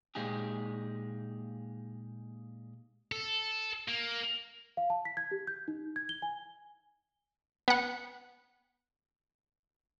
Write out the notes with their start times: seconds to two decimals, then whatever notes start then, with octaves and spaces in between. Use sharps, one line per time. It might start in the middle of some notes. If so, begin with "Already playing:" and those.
0.15 A#2 G#3 D#4 G4 G#4
3.12 A4
3.88 A#3
4.77 F5
4.90 A5
5.05 B6
5.17 G#6
5.31 G4
5.47 G6
5.68 D#4
5.96 G#6
6.09 G7
6.22 G#5
7.68 B3 F#5